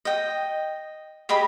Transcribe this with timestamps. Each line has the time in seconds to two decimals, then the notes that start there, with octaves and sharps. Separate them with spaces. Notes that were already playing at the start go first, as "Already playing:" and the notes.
0.05 D#5 G5
1.29 G4 G#4 D#5 B5